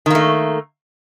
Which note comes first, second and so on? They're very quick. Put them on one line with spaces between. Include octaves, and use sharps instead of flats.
D#3 A#3 A3